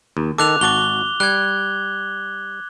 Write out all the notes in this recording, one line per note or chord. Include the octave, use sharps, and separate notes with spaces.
D#2
D#3 A4 D6 F#6 F7
G#1 F#4 A5 D6 G7
G3 F#6 G#6